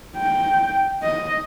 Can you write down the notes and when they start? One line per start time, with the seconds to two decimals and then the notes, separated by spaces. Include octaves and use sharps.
0.17 G5
1.03 D#5